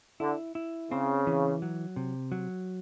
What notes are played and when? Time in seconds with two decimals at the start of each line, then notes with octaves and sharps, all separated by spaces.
0.20 D3 E4
0.55 E4
0.90 C#3 C4
1.27 E3
1.62 F#3
1.96 C3
2.32 F#3